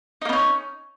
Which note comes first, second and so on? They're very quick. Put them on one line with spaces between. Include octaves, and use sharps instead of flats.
D#4 A#3 B3 C#4